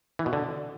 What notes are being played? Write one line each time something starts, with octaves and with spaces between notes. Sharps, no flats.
E3
B2
D3